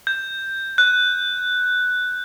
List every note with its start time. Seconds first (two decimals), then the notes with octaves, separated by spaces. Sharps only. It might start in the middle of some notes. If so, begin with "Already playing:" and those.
0.07 G6
0.78 F#6